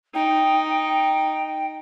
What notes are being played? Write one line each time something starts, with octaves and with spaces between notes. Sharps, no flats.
D#4 G5